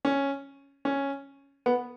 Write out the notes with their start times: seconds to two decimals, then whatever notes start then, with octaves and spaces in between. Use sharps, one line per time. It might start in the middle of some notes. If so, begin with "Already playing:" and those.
0.05 C#4
0.85 C#4
1.66 B3